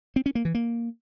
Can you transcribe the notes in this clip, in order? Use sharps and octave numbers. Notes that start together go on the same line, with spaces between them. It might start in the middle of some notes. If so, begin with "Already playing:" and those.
C4
C#4
A#3
E3
A#3